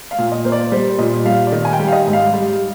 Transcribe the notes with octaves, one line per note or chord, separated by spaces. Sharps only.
F5
A#2
D#5
A#3 C5
D5
G3 C5
A#2 D#5
G3 F5
D5
D#3 D#5
G#5
G5
G3
F5
D#5
G#2
F5
G3